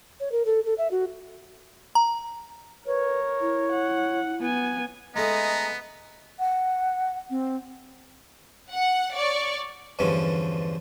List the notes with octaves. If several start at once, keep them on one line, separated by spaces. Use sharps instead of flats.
C#5
A#4
A4
A4
E5
F#4
A#5
A#4 B4 C#5
E4
F#5
B3 G#5
G#3 A3 B3 C#4 D#5 A#5
F#5
C4
F#5
C#5 D5 C#6
E2 G2 D3 F3 C#4